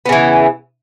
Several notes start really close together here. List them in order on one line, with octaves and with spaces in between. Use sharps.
B3 C#3 E3